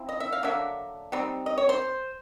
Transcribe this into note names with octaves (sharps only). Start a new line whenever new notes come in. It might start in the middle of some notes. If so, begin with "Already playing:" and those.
Already playing: F3 C4 E4
D#5
E5
F5
D3 F#3 A#3 D4 E5
G3 C4 D#4
D#5
C#5
C5